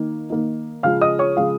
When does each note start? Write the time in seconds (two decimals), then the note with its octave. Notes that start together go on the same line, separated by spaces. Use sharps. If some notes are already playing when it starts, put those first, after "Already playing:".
Already playing: D#3 A#3 D#4
0.30 D#3 A#3 D#4
0.83 C#3 F3 G#3 F5 F6
1.01 D#5 D#6
1.19 C#5 C#6
1.37 C#3 F3 G#3 F5